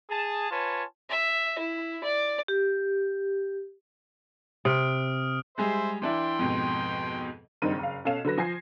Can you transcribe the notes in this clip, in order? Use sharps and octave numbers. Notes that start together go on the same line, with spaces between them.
G#4 A5
F4 B4 C#5 G#5 A5
E5
E4
D5
G4
C3 D#6 F6 D7
G3 G#3 G#4 C5 E5
E3 D4 E4 G5 C6
F2 G#2 B2
F#1 G2 D#3 C4 D#4 D#7
F#1 F5
B2 C#4 A4 F5 E7
D3 F#3 B4 A#6
F3 G#5 G#6 C7